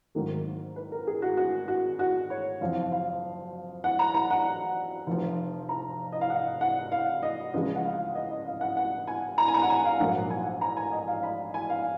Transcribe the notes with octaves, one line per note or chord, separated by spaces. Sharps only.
G#1 G#2 D#3 F#3 A#3
B4
A#4
G#4
F#4
F#4
F#4
F#4
C#5
F#1 F2 F3 F5
F5
F#5
A#5
A#5
F#5
F1 F2 F3
A#5
D#5
F5
F#5
F#5
F5
D#5
C#2 C#3 F3 G#3 D#5
F#5
F5
D#5
D#5
F5
F#5
F#5
G#5
A#5
G#5
A#5
F#5
G#5
F5
A#1 G#2 F#3 A#3 F#5
G#5
A#5
G#5
D#5
F5
B5
G#5
F5